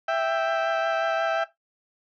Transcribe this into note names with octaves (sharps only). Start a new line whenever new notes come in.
E5 G5